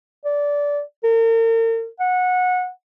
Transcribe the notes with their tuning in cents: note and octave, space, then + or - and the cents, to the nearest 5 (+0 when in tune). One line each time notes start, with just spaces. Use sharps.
D5 -20
A#4 -40
F#5 -20